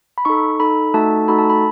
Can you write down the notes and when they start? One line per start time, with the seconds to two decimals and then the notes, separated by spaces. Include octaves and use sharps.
0.18 B5
0.25 D#4 A4 C#6
0.60 D#4 A4 B5
0.94 A3 D#4 F#4 A4 A5
1.28 A3 D#4 F#4 A4 B5
1.38 A5
1.50 B5